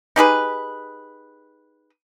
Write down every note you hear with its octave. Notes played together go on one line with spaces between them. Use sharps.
D#4 G4 G#4 B4